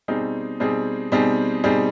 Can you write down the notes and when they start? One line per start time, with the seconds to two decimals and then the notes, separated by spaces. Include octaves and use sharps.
0.08 B2 G3 C4 D#4 G#4
0.60 B2 G3 C4 D#4 G#4
1.12 B2 G3 C4 D#4 G#4
1.64 B2 G3 C4 D#4 G#4